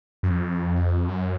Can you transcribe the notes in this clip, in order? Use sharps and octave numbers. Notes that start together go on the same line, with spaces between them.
F#2
F2
F#2